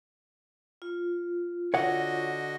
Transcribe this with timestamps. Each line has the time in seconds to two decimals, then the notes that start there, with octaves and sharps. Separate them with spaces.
0.82 F4
1.74 D3 F#4 C#5 D#5 F#5